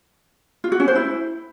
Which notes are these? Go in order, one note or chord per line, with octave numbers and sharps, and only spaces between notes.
F4
F#4
C#4
C5
E4